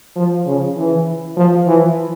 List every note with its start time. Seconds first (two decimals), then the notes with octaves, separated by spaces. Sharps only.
0.16 F3
0.46 C#3
0.76 E3
1.37 F3
1.67 E3